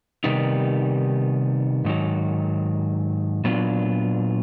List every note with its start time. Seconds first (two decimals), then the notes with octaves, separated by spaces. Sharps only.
0.24 C3 D#3 G3 B3 D#4
1.85 G#2 D#3 F#3
3.44 A#2 F#3 B3 D4 F4